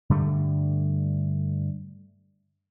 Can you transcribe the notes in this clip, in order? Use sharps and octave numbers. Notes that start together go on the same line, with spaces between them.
G2 D3 G3 A3